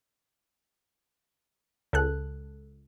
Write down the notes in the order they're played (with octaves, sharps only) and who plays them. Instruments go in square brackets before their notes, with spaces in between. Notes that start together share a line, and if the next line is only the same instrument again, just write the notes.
[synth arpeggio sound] C#2 A4 F#6